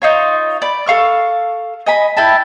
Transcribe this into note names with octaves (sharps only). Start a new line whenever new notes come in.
D#4 F4 C#5
D5 B5
A4 F5 C#6 F6
D#5 G#5 B5
E4 G5 A5 B5